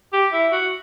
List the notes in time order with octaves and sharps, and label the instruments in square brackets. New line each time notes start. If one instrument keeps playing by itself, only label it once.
[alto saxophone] G4
E4
F#4